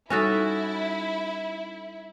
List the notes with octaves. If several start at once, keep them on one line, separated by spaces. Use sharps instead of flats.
G3 C#4 D#4 E4 F#4 A4